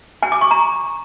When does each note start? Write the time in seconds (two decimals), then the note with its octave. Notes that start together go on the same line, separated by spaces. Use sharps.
0.23 G#5
0.32 D6
0.41 C#6
0.51 A#5